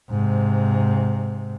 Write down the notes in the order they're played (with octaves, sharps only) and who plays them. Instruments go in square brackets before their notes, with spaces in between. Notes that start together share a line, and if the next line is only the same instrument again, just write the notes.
[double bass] G#2 C3